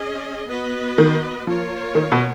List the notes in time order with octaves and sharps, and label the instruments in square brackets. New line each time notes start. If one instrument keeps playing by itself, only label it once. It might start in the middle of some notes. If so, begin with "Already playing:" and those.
Already playing: [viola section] C#4 G#4 D#5
B3 F#4 B4 D#5
[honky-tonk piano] D#3
[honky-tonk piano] F3 [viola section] A#3 F4 A#4 C#5
[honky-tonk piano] D#3
B2